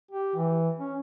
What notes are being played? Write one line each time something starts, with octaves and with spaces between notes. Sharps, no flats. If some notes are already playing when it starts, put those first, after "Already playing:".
G4
E3
C#4